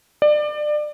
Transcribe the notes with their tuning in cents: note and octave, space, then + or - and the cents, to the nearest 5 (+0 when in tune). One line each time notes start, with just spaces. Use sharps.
D5 +25